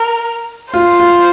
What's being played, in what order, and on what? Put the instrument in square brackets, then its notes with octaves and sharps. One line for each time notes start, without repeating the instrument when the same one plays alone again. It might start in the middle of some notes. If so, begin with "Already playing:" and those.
Already playing: [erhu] A#4
[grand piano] F4 [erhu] C5
[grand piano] F4